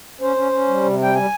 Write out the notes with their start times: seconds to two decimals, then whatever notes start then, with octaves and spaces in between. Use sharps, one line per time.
0.21 C#4 C5
0.36 C#4
0.52 C#4
0.68 G3
0.83 C3
0.99 G3 G5
1.15 G3 G#5